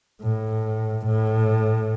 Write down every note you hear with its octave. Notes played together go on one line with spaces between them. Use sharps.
A2
A2